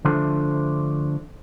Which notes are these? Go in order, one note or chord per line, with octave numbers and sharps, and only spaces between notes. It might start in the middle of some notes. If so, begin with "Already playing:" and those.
D3 F3 A3 D4 A4 C5